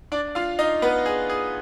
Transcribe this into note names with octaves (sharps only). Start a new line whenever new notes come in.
D4 D5
F4 F5
D#4 D#5
B3 B4
G#4
G#4